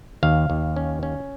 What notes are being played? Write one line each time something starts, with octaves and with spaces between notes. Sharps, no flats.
D#2 F5
D#2
C#4
C#4